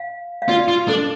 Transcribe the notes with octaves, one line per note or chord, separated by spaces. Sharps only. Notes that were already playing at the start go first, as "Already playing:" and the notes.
Already playing: F5
F5
F4 D5
F4
D4 A4